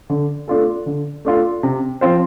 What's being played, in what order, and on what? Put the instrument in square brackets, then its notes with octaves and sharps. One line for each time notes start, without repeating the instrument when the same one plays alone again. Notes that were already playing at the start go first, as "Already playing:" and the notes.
[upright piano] D3
A3 D4 F4 A4
D3
A3 D4 F4 A4
C3
F3 C4 F4 C5